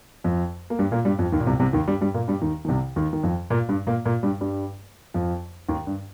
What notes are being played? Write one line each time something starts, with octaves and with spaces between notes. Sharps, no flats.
F2 F3
A#3
G2 G3
A#2 A#3
G2 G3
F2 F3
D#2 D#3
A#2
C2 C3
C2 C3
D#2 D#3
G2 G3
G2 G3
A#2 A#3
G2 G3
D#2 D#3
D#3
C2 C3
D#2 D#3
D#3
F2 F3
A#2 A#3
G2 G3
A#2 A#3
A#2 A#3
G2 G3
G2 G3
F2 F3
D#2 D#3
G2